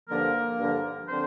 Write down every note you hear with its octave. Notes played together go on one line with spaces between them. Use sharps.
G2 D3 F3 A#3 A#4
G2 D3 F3
D3 F3 C4 C5